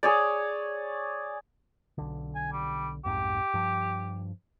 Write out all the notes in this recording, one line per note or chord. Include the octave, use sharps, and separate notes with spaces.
G#4 C#5 D5
B1 D3
G#5
G3
B1 F2 G#2 G4
G2 F3